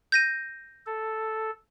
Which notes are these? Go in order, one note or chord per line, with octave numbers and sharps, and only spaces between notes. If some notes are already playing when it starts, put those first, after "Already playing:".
G6 A#6 D#7
A4